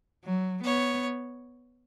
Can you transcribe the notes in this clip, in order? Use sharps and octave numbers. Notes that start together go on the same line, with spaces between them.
F#3
B3 C#5